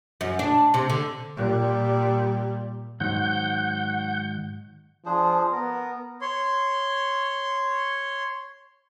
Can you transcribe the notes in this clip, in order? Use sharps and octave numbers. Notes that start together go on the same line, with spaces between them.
F#2
D4
C3
D3
A#2 G3
G#2 D#3 F#3 F#5 G6
F3 D4 G#4 C5
B3 A#4
C#5 C6